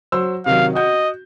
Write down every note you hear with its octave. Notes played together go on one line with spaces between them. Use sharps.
F#3 C5 E6
C3 D#3 F#3 F5
F#4 D#5 G6